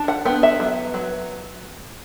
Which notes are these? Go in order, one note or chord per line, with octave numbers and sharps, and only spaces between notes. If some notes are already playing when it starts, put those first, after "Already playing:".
Already playing: D4
F#5
B3 G5
E5
F#3
F#3